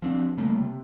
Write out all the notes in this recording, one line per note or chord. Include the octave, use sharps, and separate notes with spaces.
F3 C4 D4
C#3 G3 A3 A#3
C3